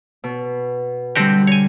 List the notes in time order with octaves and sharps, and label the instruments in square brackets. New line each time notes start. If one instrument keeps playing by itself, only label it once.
[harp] B2
[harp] D3 G3 [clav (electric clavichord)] C4 F#4 G4
[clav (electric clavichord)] C#5 G#5